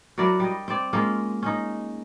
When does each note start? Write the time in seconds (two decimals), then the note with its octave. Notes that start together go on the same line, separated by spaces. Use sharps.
0.18 F#3 E4 A#4 D5
0.39 G3 D#5
0.68 C4 D5
0.93 G#3 A#3 C#4 F4
1.42 C#4 D#4